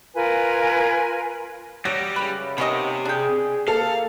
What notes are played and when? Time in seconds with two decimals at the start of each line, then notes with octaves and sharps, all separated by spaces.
0.14 F4 A#4 B4 G#5
1.85 F#3 G3 G4 A#6
2.16 F#2 C#3 B4
2.58 C3 A#3 B3 C#4 D#4 G4 D#5
3.05 D4 G#4 G5
3.68 A#3 A4 F5